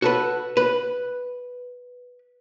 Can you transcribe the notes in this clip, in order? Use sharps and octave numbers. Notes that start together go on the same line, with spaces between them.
F#4 A4 B4
B4